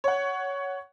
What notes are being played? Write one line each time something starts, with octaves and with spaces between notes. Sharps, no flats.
C#5 F#5